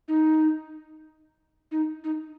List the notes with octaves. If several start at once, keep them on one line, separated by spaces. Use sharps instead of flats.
D#4
D#4
D#4